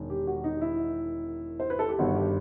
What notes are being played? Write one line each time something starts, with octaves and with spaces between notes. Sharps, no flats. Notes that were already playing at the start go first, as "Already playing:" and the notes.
Already playing: E1 D#3
G4
F#4
D#4
E4
C5
B4
A4
G4
G1 G2 D#3 F#4
G4